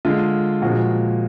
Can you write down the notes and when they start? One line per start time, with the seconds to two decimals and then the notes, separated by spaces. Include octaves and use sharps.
0.05 D3 G#3 F4
0.62 A#2 F3 G#3 F#4